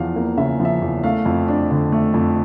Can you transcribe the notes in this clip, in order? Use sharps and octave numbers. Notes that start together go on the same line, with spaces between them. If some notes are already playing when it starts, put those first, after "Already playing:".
Already playing: E2 F3 F5
A#3
C#3 E5
F3
E5
E2
A3 F5
F2
D4
D3
A3
F2